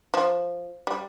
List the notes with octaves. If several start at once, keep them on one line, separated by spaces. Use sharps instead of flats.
F3
G3